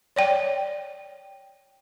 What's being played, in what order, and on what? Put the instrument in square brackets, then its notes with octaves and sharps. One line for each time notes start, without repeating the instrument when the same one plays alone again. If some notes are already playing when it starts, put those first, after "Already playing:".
[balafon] C#5 D5 G5